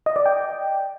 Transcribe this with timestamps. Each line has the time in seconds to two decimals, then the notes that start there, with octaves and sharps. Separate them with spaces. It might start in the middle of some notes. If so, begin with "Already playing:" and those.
0.06 D#5
0.16 D5
0.26 G5